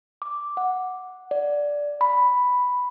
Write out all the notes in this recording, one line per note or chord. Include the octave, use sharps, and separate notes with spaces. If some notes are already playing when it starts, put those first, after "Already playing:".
D6
F#5
D5
B5